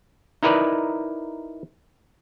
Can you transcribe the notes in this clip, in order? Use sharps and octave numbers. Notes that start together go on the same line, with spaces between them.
D#4 E4 A#4 B4 D5